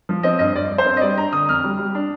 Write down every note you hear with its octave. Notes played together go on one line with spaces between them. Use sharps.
F3
C4 D#5
G2 D#5
G2 D5
G2
C5
C4
D#5
G3 D5
D4 A#5
D3 D#6
F2 F6
G3
G3
D4